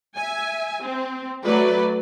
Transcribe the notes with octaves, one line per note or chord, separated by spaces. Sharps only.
E5 G#5
C4
F#3 A3 B4 D5